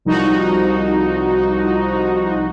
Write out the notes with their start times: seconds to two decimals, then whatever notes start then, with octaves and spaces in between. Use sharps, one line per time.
0.05 C2 F3 D#4 F#4